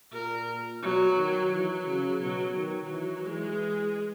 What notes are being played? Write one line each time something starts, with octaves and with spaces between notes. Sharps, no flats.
A#2 A#4
B2 F#3
D#3
E3 F#3
C#3
B2 F#3
D#3 F#3
E3
E3 G#3